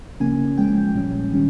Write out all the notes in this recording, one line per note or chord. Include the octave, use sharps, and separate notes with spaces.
C#3 F3 A#3 C#4 G#5
F3 G#3 C#4 G5
A#2 G3 C#4
D#3 G3 C#4